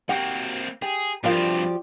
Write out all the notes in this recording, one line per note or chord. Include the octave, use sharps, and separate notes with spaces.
A#3 C4 F#4 G4 F#5
G4 G#4
G2 F3 C4 F#4 G4 A#4 D5 F5